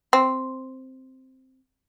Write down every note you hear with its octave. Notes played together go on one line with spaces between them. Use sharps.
C4